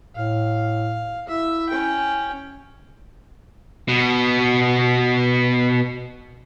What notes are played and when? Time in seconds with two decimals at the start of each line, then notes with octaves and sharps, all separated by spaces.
0.16 A2 F5
1.28 E4 E5
1.70 C#4 G5
3.88 B2 B3